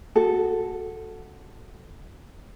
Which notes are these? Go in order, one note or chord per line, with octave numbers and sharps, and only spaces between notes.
F#4 A4